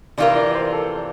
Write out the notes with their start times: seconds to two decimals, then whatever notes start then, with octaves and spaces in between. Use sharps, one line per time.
0.18 C3 E3 A#3 F4 A#4 D5
0.36 D5
0.55 C5
0.73 A4